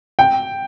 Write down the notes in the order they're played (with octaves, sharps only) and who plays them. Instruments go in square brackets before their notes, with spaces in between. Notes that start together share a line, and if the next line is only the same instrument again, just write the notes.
[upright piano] G5